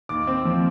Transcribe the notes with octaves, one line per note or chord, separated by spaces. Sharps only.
D#2 D6
C4
F3